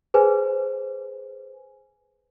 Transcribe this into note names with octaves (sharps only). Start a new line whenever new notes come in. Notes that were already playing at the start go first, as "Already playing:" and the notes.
G#4 B4 C5 G#5